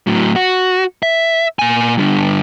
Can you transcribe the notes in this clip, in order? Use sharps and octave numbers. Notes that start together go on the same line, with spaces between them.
A2 F#3
F#4
E5
A#2 G#5
G2 D3